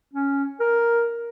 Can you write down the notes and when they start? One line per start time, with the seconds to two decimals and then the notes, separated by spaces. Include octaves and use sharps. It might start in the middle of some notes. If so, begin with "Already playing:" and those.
0.14 C#4
0.60 A#4